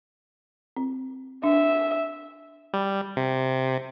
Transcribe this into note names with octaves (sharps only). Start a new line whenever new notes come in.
C4
D4 E5
G3
C3